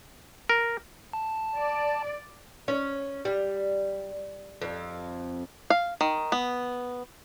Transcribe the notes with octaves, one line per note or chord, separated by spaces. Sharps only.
A#4
A5
D5
C#4 C#5
G3
F2
F5
D#3
B3